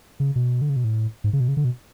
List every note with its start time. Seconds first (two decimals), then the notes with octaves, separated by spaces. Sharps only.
0.20 C#3
0.36 B2
0.61 D3
0.70 C#3
0.76 B2
0.84 A2
1.24 G#2
1.33 C#3
1.40 B2
1.48 C#3
1.57 D3
1.65 B2